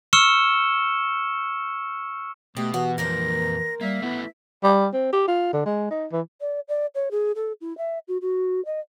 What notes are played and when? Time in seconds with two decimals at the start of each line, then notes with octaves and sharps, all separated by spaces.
0.13 C#6 E6 F6 C#7 E7 G7
2.57 B2 A3 G4 D#6
2.74 E3 F#4
2.98 F2 A#2 A#3 A#4 C5 A#6
3.81 G3 A#3 E5
4.02 A3 B3 E4 B4
4.64 G3
4.94 C4
5.13 G4
5.28 F4
5.53 D3
5.66 G#3
5.91 D#4
6.12 E3
6.41 D5
6.68 D5
6.95 C#5
7.11 G#4
7.36 A4
7.61 E4
7.78 E5
8.08 F#4
8.21 F#4
8.65 D#5